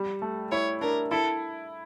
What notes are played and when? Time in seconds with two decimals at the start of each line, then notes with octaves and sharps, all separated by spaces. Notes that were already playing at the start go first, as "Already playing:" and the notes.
Already playing: G3
0.22 A3
0.52 E4 C#5
0.81 D4 A#4
1.11 E4 A4